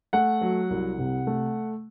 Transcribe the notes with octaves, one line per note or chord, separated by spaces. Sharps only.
A3 F#5
F#3
C2
C3
A3